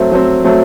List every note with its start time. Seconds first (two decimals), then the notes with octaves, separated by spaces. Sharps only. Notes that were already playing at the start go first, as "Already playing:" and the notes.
Already playing: F#3 A3 C4
0.12 F#3 A3 C4
0.44 F#3 A3 C4